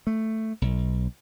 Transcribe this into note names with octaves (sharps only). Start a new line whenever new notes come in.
A3
B1